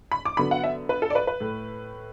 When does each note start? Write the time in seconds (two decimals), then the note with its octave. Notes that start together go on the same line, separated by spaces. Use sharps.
0.12 B5
0.25 D6
0.37 D3 F#3 B3 B5
0.51 F#5
0.63 E5
0.89 B4
1.02 A4
1.10 D5
1.15 B4
1.27 B4
1.40 A2 A3